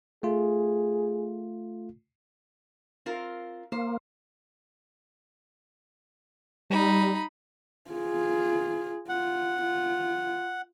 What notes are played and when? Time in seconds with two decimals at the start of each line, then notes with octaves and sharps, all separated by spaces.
0.23 A3 F4 G#4
3.06 C4 F4 A#4
3.72 A#3 C5
6.70 G3 D#4 B5
7.91 F4 G#4
9.09 F4 F#5
9.62 F4